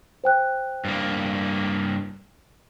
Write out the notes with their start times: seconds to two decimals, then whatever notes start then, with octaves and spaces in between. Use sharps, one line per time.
0.24 C5 G5 F#6
0.85 G2 A#3